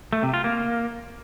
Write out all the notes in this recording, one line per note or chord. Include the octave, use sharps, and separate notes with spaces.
A3
C3
F4
A#3